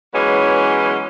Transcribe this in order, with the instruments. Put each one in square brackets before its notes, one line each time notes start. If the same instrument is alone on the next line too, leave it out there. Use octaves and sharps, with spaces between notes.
[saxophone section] E3 F#3 G#3 B3 C#4